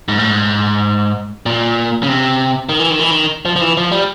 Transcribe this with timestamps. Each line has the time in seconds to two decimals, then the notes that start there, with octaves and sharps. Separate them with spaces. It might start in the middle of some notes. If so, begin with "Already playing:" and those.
0.08 G#2
0.18 A2
0.30 G#2
1.46 A#2
2.03 C#3
2.09 C3
2.69 D#3
2.79 E3
2.90 D#3
3.00 E3
3.11 D#3
3.45 F3
3.56 F3
3.61 E3
3.77 F3
3.92 G3